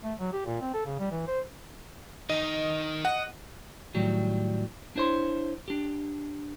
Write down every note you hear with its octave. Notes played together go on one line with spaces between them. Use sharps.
A3
F#3
G4
A#2
C4
A4
C#3
G3
E3
C5
D#3 D#4 D#5
D#5 F#5
A2 D#3 F#3 G3
D4 E4 C5 C#5 C6
D4 G4